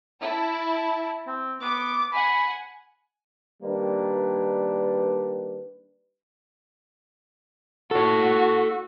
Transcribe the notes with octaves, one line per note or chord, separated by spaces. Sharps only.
E4 A5
C4
B3 D6
F#5 G#5 B5
D#3 G3 A#3 D4 B4
F#4 A4 C#5